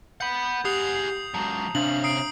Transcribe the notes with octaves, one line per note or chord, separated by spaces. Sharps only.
F#5 B5 G6
G4 G#4 F#5 D#6 C7 F7
C#2 F#3 A5 A#5
C3 C#4 D4 F5 F#7
A#5 D#6 C7 D7